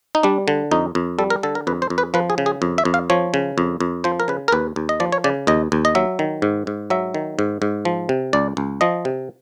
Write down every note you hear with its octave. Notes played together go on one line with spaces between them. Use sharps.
D#4
G3 D4
D3
F2 D#4
F2
G3 A4
A#4
D3 A4
A#4
F2 B4
C5
F2
B4
F3 B4
G#4
C#3
G#4
F2
E5
F2
F5
F3 C#5
C#3
F2
F2
F3 C5
A#4
C#3 B4
A#4
D#2 B4
D#2
D#5
F3 D5
C#5
C#3 D5
D#2 D#5
D#2
D#5
F#3 E5
D#3
G#2
G#2
F#3 E5
D#3
G#2
G#2
F3
C3
C#2 D5
C#2
F3 D#5
C3